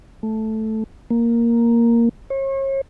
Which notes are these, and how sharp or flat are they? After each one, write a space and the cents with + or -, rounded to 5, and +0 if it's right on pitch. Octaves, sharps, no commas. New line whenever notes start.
A3 -5
A#3 +0
C#5 -40